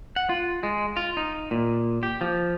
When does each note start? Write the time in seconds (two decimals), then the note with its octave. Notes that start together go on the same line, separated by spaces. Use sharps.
0.16 F#5
0.29 F4
0.63 G#3
0.97 F4
1.17 D#4
1.51 A#2
2.03 G4
2.21 F3